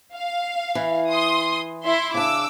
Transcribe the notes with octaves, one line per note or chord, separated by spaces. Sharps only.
F5
E3
C6 D#6
E4 E5 C6
C#3 D4 D6 E6